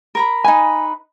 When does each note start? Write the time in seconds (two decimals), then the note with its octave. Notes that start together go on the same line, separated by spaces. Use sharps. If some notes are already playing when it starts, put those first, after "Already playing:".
0.15 A#4 A#5 B5
0.45 D#4 B4 G#5